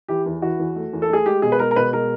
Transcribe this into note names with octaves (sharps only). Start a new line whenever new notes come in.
E3 G4
E2
E3 F#4
E2
A3
E2
A4
A3 G#4
G#3 G4
B2 G#4
B4
G#3 A#4
A#4
B2 B4
G#3 A#4